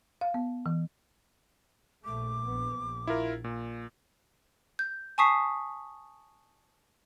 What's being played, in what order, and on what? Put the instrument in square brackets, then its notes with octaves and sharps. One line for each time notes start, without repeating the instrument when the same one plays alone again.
[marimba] F5
B3
E3
[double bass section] A#1 A#2 A3 [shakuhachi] D6
[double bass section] A#1 B3
A#1
[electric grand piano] E4 F4 A#4
A#2
[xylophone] G6
G#5 A5 C#6 D#6 B6 C7